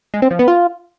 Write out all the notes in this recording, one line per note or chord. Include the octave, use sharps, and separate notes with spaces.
G#3
C4
F3
B3
F4